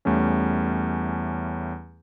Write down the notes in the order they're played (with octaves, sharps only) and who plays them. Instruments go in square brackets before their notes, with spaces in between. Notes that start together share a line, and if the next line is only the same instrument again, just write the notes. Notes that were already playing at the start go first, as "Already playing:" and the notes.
[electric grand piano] E2 G3 A3 C#4